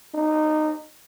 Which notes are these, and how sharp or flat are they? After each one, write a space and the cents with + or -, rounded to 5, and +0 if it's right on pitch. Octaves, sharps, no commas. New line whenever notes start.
D#4 -15